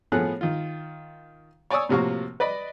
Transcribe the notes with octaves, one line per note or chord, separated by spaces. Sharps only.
A2 F3 A3 B3 G#4 F#6
D#3 F4
C#5 D5 G#5 C#6 D#6 E6
A2 C3 F3 A#3 F#4 C#6
B4 D5 D#5 B5